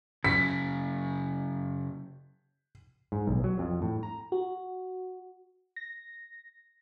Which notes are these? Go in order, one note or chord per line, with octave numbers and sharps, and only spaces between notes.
C#3 F#3 B6
G#2
B1
F#3
F2
A2
A#5
F#4
A#6